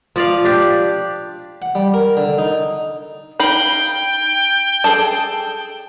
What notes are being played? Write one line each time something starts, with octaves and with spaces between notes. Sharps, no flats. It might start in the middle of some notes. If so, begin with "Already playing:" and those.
F3 D5 F5
D4 G4
F#5
G3
A#4
D3
D#4
D#4 F5 G5 B5
G#4 A4 A5